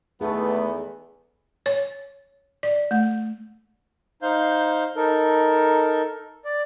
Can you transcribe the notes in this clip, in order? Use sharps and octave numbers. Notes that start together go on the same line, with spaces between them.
E2 A3 B3 D#4 G#4
C#5
D5
A3
D#4 C5 F5 G6
D#4 A4 A#4
D5